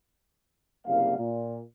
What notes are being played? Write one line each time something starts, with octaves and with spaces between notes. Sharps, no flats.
F#1 C2 G3 A#3 F5
A#2